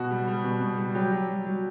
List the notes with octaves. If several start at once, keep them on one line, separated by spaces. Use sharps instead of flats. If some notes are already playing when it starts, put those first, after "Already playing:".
Already playing: B2 F#4
G3
G3
B2
B2
G3
F#3 G4
F#3
F#3
F#3